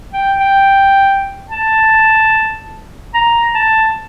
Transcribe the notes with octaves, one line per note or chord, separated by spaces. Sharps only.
G5
G5
A5
A#5
A5